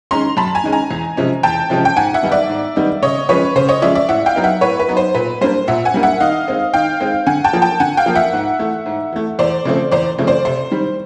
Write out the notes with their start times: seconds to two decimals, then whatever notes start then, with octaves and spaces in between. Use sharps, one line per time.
0.11 D#3 G#3 C#4 A#5 C6
0.37 F#2 A5 B5
0.55 G#5 A#5
0.64 D#3 G#3 C#4
0.72 G#5 A#5
0.91 E2
1.17 C3 F3 G#3 C#4
1.43 E2 G5 A5
1.70 C3 F3 G#3 C#4
1.85 G5
1.96 G#2 F#5 G#5
2.14 E5 F#5
2.23 D#3 G3 B3 D#4
2.32 D5 E5
2.49 G#2
2.76 D#3 G3 B3 D#4
3.03 C#3 C#5 D#5
3.29 F3 G#3 C#4 B4 C#5
3.55 C#3 C5
3.69 C#5 D#5
3.82 F3 G#3 C#4 D5 E5
3.95 D5 E5
4.09 A2 E5 F#5
4.26 F5 G5
4.35 F#3 B3 D#4
4.44 E5 F#5
4.61 A2 B4 C#5
4.80 B4
4.88 F#3 B3 D#4
4.97 C5
5.14 A#2 B4
5.41 G3 A#3 D4 C5
5.68 A#2 E5 F#5
5.85 F#5 G#5
5.94 G3 A#3 D4
6.03 E5 F#5
6.21 D#3 D#5 F5
6.48 G#3 C4 D#4
6.74 D#3 F5 G5
7.00 G#3 C4 D#4
7.27 D3 F#5 G#5
7.44 G5 A5
7.53 F3 A#3
7.62 G5 A5
7.80 D3 F#5 G#5
7.97 F5 G5
8.06 F3 A#3
8.15 E5 F#5
8.33 G#2
8.59 E3 A3
8.86 G#2
9.13 E3 A3
9.39 E2 C5 D5
9.65 C#3 F3 A3 C4
9.91 E2 C5 D5
10.18 C#3 F3 A3 C4
10.27 C5 D5
10.45 C3 C5
10.71 D#3 G3